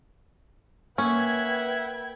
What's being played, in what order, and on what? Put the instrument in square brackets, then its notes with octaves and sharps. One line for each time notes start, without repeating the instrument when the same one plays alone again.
[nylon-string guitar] A#3 [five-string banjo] C#4 [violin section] B4 G5 G#6 [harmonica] E5 F#5